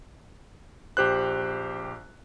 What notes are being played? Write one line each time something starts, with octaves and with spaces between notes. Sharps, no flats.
A#1 G4 C5 F#6